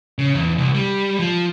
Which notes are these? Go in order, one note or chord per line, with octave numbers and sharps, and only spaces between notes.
C#3
E2
C2
G3
F3